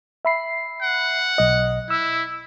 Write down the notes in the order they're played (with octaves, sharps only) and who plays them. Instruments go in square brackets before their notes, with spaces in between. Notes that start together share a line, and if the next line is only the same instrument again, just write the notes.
[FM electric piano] E5 B5 C7
[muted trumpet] F#5
[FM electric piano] B1 D#5
[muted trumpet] E4 [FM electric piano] E6